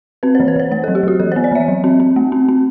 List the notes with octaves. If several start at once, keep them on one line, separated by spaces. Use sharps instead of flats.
C4 B4
C5
E3
B4
E3 C5
A3 C5
A4
F#3
G4
F#3 F#4
E3 A4
C5
B3
D5
E3 E5
F#3
C4
C4
A3
C4
C4